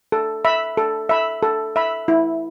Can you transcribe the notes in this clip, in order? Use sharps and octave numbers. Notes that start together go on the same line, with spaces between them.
A4
E5 B5
A4
E5 B5
A4
E5 B5
E4